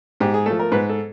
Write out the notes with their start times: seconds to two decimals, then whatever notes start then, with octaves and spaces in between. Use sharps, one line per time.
0.20 G#2 G4
0.34 G#4
0.46 F3 A3 A4
0.59 A#4
0.72 G#2 B4
0.89 A4